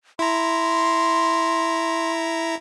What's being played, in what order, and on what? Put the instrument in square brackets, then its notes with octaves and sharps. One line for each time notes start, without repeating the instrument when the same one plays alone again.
[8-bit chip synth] E4 A#5 [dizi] C6